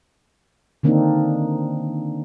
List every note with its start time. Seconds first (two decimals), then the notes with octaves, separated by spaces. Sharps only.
0.83 D3 D#3 A#3 C4 D4 D#4